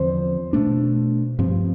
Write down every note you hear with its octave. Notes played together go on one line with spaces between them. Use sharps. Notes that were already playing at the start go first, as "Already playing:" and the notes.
Already playing: E2 D3 F3 C4 C5
B2 A3 D4
G2 F3 C4